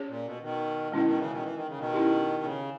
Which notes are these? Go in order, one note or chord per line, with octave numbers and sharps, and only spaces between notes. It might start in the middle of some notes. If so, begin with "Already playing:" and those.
Already playing: C#4 G#4 C#5
A#2
B2
B2 D#3
B2 D#3 G#3 C#4 E4
B2 D#3
C#3 E3
B2 D#3
E3
D#3
C#3
B2 D#3
C#4 E4 G4
C#3